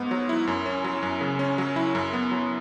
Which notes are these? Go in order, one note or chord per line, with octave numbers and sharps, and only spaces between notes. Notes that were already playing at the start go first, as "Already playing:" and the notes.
Already playing: G#2 B3
F#3
E4
F#2
C#4
F#3
F#2
C#3
C#4
F#3
E4
F#2
B3
F#3